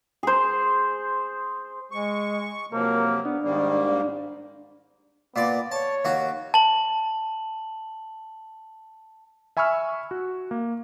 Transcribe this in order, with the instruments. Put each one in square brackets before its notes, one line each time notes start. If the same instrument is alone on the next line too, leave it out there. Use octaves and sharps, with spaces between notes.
[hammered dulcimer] G#4 C5
[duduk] G#3 [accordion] C#6
[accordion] C3 F3 F#3 [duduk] A#3 [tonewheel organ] A#4
[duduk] B3 [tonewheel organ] D4
[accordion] G#2 G3 A#3 [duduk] D#3
[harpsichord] A#2 D5 [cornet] B3
[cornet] C#5 [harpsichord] A5
[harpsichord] D#2 F#4
[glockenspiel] A5 F#7
[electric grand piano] E5 G#5 B5 C#6 E6 F6
F#4
A#3